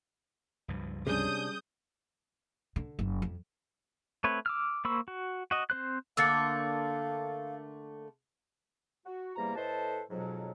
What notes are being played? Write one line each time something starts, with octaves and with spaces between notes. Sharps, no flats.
C#2 G2 F3
C3 G3 C#4 D4 G#4 D#6 G6
D3
F#1
F2
A3 C4 B4 C#5
D6 E6 F6
A#3 C5 B5 C#6 E6
F#4
F#4 D#5
C4 C5 F#6
D3 A3 A#3 F5 E6 A6 C#7
F#4
E2 C3 G3 A#3 A#5
A2 A4 B4 C5 D#5 A5
F2 G#2 B2 F#3